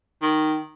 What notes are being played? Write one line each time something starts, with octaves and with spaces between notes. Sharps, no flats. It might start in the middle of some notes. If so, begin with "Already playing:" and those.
D#3